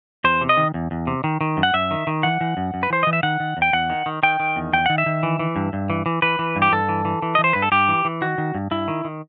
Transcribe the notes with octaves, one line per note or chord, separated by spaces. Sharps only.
E2 C5
C3
D#5
D#3
E2
E2
C3
D#3
D#3
F#2
F#5
F#2 E5
D#3
D#3
E3 F#5
E3
F#2
F#2
B4
E3 C5
E3 D#5
E5
D#3 F#5
D#3
E2
G5
E2 F#5
D#3
D#3
D#3 G5
D#3
E2
E2 G5
D#3 F#5
E5
D#3
E3
E3
G2
G2
E3
E3
E3 B4
E3
G2
G4
G2 A4
E3
E3
E3
D#5
E3
C5
G2 B4
A4
G2 G4
E3
E3
D#3 F#4
D#3
G2
G2 E4
D#3
D#3